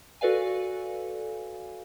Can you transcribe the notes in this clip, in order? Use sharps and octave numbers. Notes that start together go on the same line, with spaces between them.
F#4 A4 B4 D5 F5 G#5